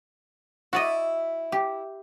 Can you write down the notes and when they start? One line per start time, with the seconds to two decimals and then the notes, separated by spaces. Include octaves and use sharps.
0.73 E4 F#4 D5 D#5
1.52 G4